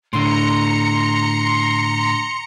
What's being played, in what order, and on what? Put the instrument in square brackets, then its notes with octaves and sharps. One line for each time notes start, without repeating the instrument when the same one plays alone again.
[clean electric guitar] A2 D3 [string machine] A#5 C#7 [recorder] C6